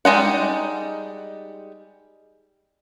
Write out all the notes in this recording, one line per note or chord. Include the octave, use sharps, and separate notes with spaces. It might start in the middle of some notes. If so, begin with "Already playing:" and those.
G3 G#3 D#4 F#5